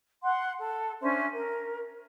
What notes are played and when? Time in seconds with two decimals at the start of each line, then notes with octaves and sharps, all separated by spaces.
0.23 F#5 C6
0.60 A4
1.01 C#4 D4 C5 E5
1.32 A#4